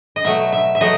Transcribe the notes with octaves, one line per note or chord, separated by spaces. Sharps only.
D#5
B2 F#3 A3 E5
E5
E5
B2 F#3 A3 D#5